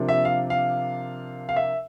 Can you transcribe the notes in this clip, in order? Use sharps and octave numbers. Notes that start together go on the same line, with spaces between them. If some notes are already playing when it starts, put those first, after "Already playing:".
Already playing: C3 F3 A#3 D4
E5
F5
F5
F5
E5